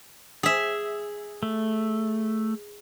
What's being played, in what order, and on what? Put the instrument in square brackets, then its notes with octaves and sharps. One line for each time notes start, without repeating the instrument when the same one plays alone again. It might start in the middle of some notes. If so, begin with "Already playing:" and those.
[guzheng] G#4 E5
[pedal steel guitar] A3